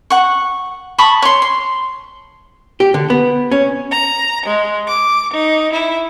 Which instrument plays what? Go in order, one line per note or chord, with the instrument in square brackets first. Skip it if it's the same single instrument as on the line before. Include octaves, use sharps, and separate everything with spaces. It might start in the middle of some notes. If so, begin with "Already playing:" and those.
[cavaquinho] F#5 C#6
A5 B5 C#6 D#6
C#5 C6
C6
[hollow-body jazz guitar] G4
D3
B3
C#4
[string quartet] A#5
G#3
D6
D#4
E4